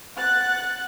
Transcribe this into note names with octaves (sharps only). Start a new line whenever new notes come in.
F#5 F#6 A6